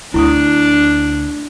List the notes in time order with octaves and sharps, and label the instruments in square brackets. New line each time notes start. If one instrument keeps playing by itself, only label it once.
[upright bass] D2 [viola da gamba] D4 [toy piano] E4 C#6 D#6